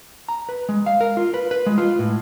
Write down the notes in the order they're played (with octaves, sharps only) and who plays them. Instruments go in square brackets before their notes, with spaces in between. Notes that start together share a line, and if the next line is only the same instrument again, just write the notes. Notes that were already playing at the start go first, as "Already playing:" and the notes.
[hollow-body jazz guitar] A#5
B4
G#3
F5
A#4
F4
B4
B4
G#3
F4
A2